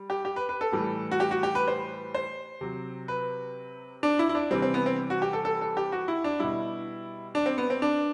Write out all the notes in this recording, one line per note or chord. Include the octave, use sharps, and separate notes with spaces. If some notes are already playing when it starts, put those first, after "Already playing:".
Already playing: G3
G4
G4
B4
B4
A4
A2 E3 G3
F#4
G4
F#4
G4
B4
C5
C5
C3 F#3
B4
D4
E4
E4
D4
C3 E3 G3 C4
C4
B3
C4
F#4
G4
A4
A4
A4
G4
F#4
E4
D4
B2 G3 E4
D4
C4
B3
C4
D4